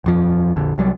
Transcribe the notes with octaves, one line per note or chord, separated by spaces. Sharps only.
D#1 F2 F3
A#1 F2 D3
C2 F#3 G3